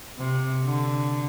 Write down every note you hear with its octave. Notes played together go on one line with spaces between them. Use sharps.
C3
D3